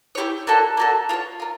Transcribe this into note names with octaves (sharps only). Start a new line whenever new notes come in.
E4 G4 A#4 C#5
A#3 D4 F#4 A4
A#3 D4 F#4 A4
F4 A#4 C#5
F4 A#4